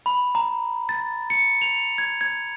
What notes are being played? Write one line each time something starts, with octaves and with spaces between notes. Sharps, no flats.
B5
A#5
A6
C#7
F7
G#6
G#6